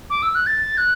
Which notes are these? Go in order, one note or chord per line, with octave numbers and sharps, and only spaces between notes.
D6
E6
F#6
A6
F#6